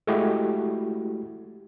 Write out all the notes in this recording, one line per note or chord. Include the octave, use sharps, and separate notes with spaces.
G#3 A3 E4 F#4 G4